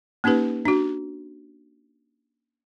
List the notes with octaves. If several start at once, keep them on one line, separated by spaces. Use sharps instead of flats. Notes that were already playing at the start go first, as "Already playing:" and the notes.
A#3 C#4 D#4 G4 B4
D4 F#4